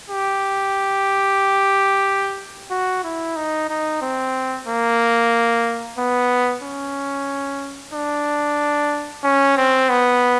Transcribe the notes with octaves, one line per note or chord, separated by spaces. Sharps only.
G4
F#4
E4
D#4
D#4
C4
A#3
B3
C#4
D4
C#4
C4
B3